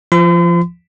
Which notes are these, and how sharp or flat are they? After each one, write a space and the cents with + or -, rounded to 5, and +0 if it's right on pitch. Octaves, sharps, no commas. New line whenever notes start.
F3 -20 C6 -45